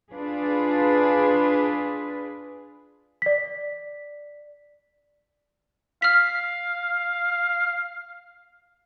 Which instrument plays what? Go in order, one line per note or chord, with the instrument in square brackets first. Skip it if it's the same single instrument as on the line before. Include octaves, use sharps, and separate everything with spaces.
[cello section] D4 F4 G#4 B4
[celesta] D5 B6
[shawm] F5 [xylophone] F6 B6